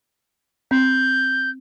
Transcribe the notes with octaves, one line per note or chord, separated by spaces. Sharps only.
C4 G6